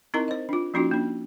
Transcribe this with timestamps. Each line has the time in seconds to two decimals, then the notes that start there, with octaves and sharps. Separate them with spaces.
0.14 C4 D#4 E4 A#4 D#5 A#5
0.28 C5 D#5
0.49 D4 F4
0.74 F3 A#3 C#4 D#4 F4 F#4
0.91 A#3 D4